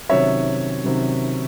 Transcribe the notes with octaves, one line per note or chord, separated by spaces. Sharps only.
C3 D#3 F#3 C#4 C#5 E5
C3 D#3 F#3 C#4